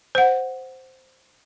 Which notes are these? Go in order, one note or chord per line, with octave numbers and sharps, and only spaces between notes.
C5 F#5